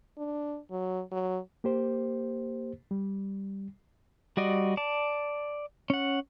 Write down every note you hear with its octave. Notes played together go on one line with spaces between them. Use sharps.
D4
F#3
F#3
A#3 G4 C5
G3
G3 F#4 D5 D#5
D5 A5
C#4 F#5